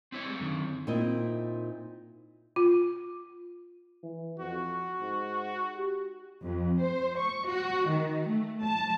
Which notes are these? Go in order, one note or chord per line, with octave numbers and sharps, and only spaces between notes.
C4 E4 C#5
G3 G#3
F#2 D3 D#3
A#2 C4 D#4 E4 D#5
F4
E3
F2 F#4
G#2
G4
F2
C5
C#6
F#4
D#3
A3
A5